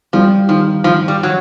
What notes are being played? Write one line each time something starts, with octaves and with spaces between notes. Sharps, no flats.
F3 G3
D#3 F3
D#3 F3
G3
F#3